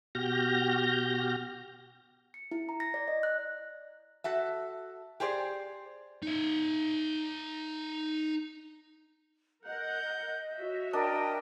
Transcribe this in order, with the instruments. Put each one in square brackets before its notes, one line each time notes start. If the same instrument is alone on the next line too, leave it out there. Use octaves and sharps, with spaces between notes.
[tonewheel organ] B2 F#4 G4 F6 G6 A#6
[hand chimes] C#7
E4
A#5
A#6
D5
D#5
F#6
[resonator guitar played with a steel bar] F#4 A4 E5
G4 G#4 C5 D5
[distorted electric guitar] D#4 E5
[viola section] A#4 F#5 [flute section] D#5 [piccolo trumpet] G6
[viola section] F#4 C#5 E5
[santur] D4 [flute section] A#4 G5 [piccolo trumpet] D#5